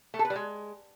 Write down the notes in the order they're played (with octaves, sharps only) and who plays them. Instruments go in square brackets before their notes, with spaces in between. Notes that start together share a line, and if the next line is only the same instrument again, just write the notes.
[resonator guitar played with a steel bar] A3
A4
B4
G3
G#3